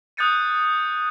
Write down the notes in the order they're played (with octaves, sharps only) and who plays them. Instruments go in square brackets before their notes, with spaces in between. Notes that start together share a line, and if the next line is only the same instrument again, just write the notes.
[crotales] D#6 F#6 G6 A6 C#7 D#7